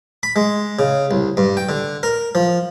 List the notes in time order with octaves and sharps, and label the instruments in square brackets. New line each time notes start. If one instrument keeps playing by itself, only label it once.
[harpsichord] B5
G#3
C#3
C2
G2
G5
D3
A#4
F3